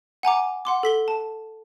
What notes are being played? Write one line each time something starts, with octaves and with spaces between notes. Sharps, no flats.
F#5 G#5 A#5 D6
F#5 C6 D6
A4 B6 G7
A5